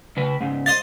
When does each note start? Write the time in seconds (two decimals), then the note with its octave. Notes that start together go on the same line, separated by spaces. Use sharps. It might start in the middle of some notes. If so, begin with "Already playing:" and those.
0.17 C#3 B4
0.40 G#2 C#3
0.66 C5 D#5 F5 A6